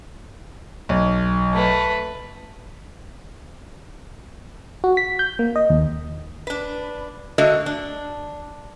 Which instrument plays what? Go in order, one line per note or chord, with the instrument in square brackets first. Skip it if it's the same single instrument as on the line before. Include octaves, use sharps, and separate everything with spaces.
[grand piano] B1
[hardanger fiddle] A3 B4
[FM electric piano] F#4
B6
G6
A#3
D#5
D#2
[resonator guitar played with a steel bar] D4 B4
D3 A3 F#4 D5 D#5
D4